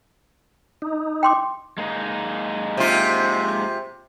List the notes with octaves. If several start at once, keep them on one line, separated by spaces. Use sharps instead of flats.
D#4
G5 C6 D6
G#3 A#3 D#4
C3 F4